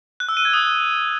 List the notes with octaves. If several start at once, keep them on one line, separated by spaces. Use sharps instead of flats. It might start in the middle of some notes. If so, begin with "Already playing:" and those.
F#6
E6
D#7
G#6
D#6